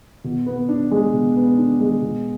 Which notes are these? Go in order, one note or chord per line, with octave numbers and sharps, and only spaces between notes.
B2
B3
D4
G#3
B2
B3
D4
G#3
B2